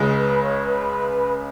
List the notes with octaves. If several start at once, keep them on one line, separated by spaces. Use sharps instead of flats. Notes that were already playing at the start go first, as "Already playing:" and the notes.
Already playing: C#2 C#3 G#3
B4
C#5
B4